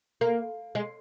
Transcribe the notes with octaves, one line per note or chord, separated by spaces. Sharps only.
A#3
G#3